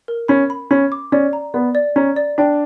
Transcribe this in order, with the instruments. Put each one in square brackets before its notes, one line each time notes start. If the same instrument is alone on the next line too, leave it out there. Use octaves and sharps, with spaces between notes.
[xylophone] A#4
[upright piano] C#4 [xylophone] B5
[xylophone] B5
[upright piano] C#4 [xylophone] B5
[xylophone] D6
[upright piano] C#4 [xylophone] D5
[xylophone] A#5
[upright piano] B3 [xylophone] D5
[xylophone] D5
[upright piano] C#4 [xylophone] A#5
[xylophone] D5
[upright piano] D4 [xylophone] G5